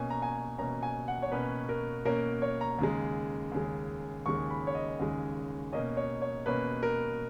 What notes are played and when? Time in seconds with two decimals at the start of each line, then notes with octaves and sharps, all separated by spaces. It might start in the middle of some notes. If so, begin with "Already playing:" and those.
Already playing: B2 A#3 C#4 G#5
0.10 A#5
0.22 G#5
0.58 B2 A#3 C#4 A#5
0.83 G#5
1.08 F#5
1.22 C#5
1.32 B2 A#3 C#4 B4
1.69 A#4
2.05 B2 A#3 C#4 A#4
2.42 C#5
2.61 A#5
2.79 D#2 C#3 G#3
3.52 D#2 C#3 G#3
4.26 D#2 C#3 G#3 C#6
4.50 B5
4.67 C#5
4.75 D#5
4.99 D#2 C#3 G#3
5.72 B2 A#3 C#4 D#5
5.97 C#5
6.22 C#5
6.46 B2 A#3 C#4 B4
6.83 A#4